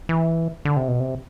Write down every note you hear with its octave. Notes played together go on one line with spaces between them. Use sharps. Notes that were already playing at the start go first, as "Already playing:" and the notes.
E3
D3
C3
B2
C3